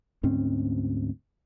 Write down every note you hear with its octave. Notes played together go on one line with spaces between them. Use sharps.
D2 G#2 C4 C#4